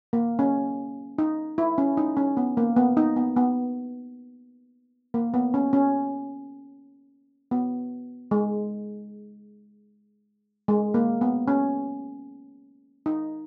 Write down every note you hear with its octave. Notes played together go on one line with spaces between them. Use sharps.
A#3
C#4
D#4
E4
C#4
D#4
C#4
B3
A#3
B3
D#4
B3
B3
A#3
B3
C#4
C#4
B3
G#3
G#3
A#3
B3
C#4
D#4